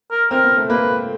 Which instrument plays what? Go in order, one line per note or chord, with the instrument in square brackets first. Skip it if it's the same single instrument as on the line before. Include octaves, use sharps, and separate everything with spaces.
[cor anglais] A#4
[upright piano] C4 [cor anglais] A#4
[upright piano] B3
A3
[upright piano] A#3 [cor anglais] B4